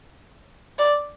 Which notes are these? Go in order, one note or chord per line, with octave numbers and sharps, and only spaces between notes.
D5